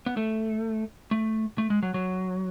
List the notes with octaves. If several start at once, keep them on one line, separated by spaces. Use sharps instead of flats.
B3
A3
A3
A3
G#3
F#3
F#3